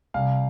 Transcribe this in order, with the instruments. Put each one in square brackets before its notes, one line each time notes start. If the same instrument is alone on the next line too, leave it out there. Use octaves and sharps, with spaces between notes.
[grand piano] C2 F5